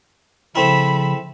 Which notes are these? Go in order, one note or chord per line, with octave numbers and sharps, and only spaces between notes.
C#3 F3 A3 C4 E4 B5